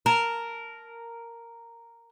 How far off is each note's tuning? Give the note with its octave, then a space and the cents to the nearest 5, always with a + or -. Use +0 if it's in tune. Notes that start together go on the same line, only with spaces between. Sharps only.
A#4 -5 A5 +0